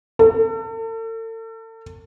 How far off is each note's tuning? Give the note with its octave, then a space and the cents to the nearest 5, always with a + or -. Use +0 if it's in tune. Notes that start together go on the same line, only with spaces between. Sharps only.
A4 +40